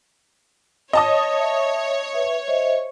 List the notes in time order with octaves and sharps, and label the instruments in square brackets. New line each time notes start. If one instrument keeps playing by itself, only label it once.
[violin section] C#5 [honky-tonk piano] D#5 A5 D#6
[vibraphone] E5
B4 E5
C5 D#5 E5